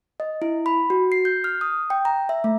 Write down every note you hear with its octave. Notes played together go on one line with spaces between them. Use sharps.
D#5
E4
B5
F#4
C7
G6
F6
D#6
G5
A#5
E5
A3